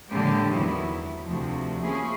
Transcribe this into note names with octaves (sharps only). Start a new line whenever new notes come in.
A2 D3 G#3 A#3 G4
E2 D#3 F#3 B3 E4
D2 C3 F3 A3
F3 A#3 C#4 E4 G#4